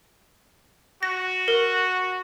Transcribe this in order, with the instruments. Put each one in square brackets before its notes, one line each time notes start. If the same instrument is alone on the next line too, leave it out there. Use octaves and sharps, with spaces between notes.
[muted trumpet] F#4 [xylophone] A#6
[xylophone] A#4